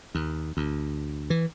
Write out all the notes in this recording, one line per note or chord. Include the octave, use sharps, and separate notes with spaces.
D#2
D2
E3